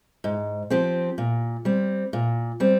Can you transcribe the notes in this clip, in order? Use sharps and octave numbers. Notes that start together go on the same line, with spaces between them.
G#2
F3 C4 G4
A#2
G3 C4
A#2
G3 C4